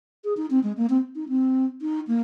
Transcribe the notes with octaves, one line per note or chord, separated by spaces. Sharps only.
G#4
D#4
C4
G#3
A#3
C4
D#4
C4
D#4
A#3